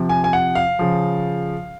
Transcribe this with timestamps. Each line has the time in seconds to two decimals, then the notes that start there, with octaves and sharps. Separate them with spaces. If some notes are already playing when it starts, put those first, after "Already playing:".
Already playing: C3 F3
0.09 G#5
0.24 G#5
0.33 F#5
0.55 F5
0.79 C#3 F3